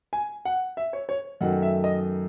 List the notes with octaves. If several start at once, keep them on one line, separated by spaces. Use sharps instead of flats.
G#5
F#5
E5
C#5
C#5
F#2 D#3 A3 D#4 F#5
E5
D#5